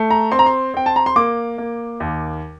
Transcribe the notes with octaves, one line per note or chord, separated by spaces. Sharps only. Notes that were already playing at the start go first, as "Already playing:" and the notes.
Already playing: A3
A#5
C4 C6
A#5
C6
C4 G5
A5
A#5
C6
A#3 D6
A#3
D#2